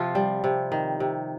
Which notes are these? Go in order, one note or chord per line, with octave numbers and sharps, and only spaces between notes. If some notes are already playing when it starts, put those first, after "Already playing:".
Already playing: C3 F3 F4
G3
C3
D#3
C3